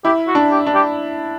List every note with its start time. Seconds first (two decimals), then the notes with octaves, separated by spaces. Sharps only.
0.05 E4 G4
0.27 F#4
0.35 D4
0.51 G4
0.66 D4
0.74 G4